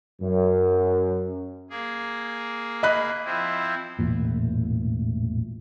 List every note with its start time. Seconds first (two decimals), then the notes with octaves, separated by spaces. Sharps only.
0.21 F#2
1.70 A#3 G#4
2.83 D#5 B5 F#6
3.25 F3 C4 E4
3.99 E1 A1 A#2